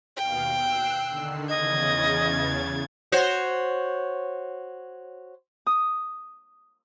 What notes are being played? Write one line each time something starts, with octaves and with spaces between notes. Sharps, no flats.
D#2 B2 F5 G5
E6 F#6 C7
D3 D#3 E6
E2 C#3 D#5 G#6 A6
F#4 C5 C#5
D#6